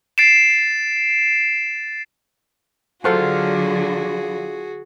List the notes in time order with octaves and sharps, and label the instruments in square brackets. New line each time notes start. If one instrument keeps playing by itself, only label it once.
[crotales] A6 C7 D7 E7
[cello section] D3 F#3 [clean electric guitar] F4 [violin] F#4 G#4 [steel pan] A4 C5 F#5